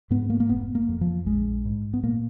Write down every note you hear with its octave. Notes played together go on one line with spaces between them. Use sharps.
G#2 B3
A#3
A#3
F1 B3
A#3
F2
F3
A#1 G#3
G#2
B3
A#2 A#3